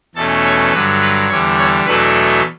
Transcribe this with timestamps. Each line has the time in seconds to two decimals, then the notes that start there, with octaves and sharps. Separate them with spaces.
0.15 E2 B2 A3 C#4 A4 A5
0.44 C#5 C#6
0.72 G2 D3 F#3 B4 B5
1.01 B4 B5
1.29 E2 D3 G3 C#5 C#6
1.57 C#5 C#6
1.85 E2 B2 F#3 A3 D4 B4 B5